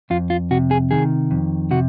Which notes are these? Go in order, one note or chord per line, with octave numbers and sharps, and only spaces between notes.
F2 F4
F4
C3 F#4
G#4
D#3 G#4
F2
C3 F#4